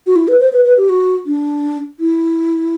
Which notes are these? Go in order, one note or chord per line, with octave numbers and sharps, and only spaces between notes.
F#4
E4
B4
C5
B4
B4
G4
F#4
D4
E4